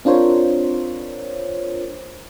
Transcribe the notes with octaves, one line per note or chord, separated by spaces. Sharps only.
C4 D4 F4 A#4 C5 C#5